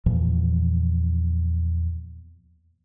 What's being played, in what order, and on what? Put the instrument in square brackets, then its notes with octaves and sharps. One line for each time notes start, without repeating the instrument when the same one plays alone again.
[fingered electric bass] E2 A#2 E3 F3